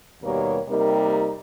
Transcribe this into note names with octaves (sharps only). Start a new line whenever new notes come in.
D#2 B2 G3 A#3 A#4 C#5
C3 G3 A#3 D#4 A#4